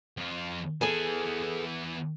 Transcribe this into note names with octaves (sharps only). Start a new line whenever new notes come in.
F2 F4
E3 B3 G#4 A4 G#5